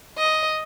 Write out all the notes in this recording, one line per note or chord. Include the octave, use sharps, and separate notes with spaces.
D#5